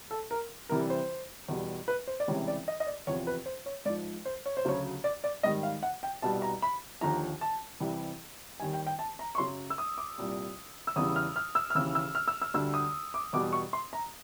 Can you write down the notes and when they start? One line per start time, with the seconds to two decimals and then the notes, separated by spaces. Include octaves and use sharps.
0.11 A4
0.31 A#4
0.69 C2 C3 E3 G3 A#4
0.90 C5
1.48 E2 B2 G3
1.88 B4
2.07 C5
2.20 D5
2.28 C#2 C3 E3 G3 C#5
2.48 D5
2.68 D#5
2.80 D#5
2.87 D5
3.07 E2 C3 F3 C#5
3.27 B4
3.46 C5
3.66 C#5
3.85 G#2 D5
3.89 F3
4.25 C5
4.46 C#5
4.57 C5
4.65 D2 C#3 F#3 C#5
5.04 D5
5.24 D5
5.43 G#2 D#3 G3 D#5
5.63 F5
5.83 F#5
6.03 G5
6.22 C2 B2 G3 A5
6.42 A#5
6.62 B5
7.01 D#2 D3 F3 A#5
7.41 A5
7.80 C2 C3 E3 G3
8.60 D#2 D#3 G3 G#5
8.73 G5
8.87 G5
8.99 A5
9.19 A#5
9.35 C#6
9.38 F#2 C#3 F#3 C6
9.70 E6
9.78 D#6
9.98 D6
10.18 C2 A#2 G3
10.87 E6
10.96 E2 C#3 E3 G3 D#6
11.16 F6
11.36 F6
11.55 E6
11.70 F6
11.75 D#2 C#3 E3 E6
11.95 E6
12.15 F6
12.28 E6
12.42 E6
12.54 D2 D3 G3 E6
12.74 D#6
13.14 D6
13.33 E2 B2 G3 D6
13.53 C#6
13.73 C6
13.93 A#5